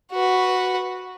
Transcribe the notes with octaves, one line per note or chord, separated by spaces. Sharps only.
F#4 B4